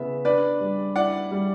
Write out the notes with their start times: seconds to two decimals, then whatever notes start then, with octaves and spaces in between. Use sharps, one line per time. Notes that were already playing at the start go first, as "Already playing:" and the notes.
Already playing: C#3 E3 B3 E5
0.25 D4 B4 D5
0.61 G3
0.96 E4 D5 F#5
1.31 G3